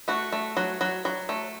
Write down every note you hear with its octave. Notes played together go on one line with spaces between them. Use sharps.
A3 F#4
A3
F#3
F#3
F#3
A3